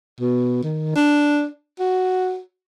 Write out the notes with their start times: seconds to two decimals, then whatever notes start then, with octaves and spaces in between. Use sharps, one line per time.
0.20 B2
0.63 D#3
0.95 D4
1.79 F#4